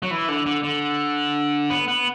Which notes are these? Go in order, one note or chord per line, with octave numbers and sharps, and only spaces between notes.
F#3
E3
D3
D3
D3
B3
B3